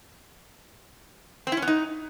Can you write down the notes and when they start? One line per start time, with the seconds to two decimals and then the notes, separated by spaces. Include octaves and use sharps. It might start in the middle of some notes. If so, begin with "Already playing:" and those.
1.47 C4
1.52 E4
1.57 C#4
1.62 B3
1.68 D#4